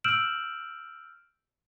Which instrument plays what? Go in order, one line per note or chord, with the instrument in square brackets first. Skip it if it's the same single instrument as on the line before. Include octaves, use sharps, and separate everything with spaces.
[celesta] E6 F6 G6 D7 E7 F#7